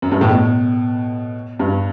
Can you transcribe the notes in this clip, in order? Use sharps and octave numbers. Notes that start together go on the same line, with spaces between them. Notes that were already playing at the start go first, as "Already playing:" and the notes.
F#2
G2
A2
B2
G2